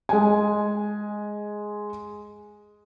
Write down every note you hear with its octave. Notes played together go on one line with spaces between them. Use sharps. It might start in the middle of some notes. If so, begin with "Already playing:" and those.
G#3 G#5